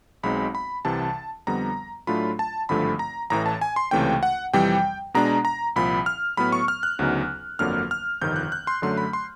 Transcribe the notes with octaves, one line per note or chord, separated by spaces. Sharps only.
B1 B2 G#3 C4 D#4 B5
B5
C2 C3 E3 A5
F2 D3 G3 B3 A#5
A2 F#3 A3 D4 F4 B5
A5
G#1 G2 D3 F3 A3 B5
A#5
A1 A2 E3 A#5
A5
G#5
C6
C#2 C3 E3 A3 C#4 G5
F#5
F2 C3 E3 G3 G5
B2 G#3 B3 D4 A#5
A#5
C2 A#2 F3 B5
F6
A2 F#3 B3 B5
C#6
F6
F#6
D2 C#3 F#3 B3 D#4
G1 F2 D3 F#3 A#3 F6
F6
G1 F2 C3 D#3 G6
F#6
F#6
C6
F#2 D3 F#3 A3 C6
B5
C6